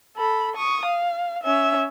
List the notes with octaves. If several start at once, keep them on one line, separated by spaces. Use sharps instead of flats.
A4 B5
C#6 D#6
F5
C#4 E5